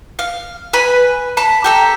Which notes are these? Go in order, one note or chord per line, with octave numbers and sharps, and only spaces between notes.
F5
B4 G#5 B5
A5 B5
G4 A4 A#5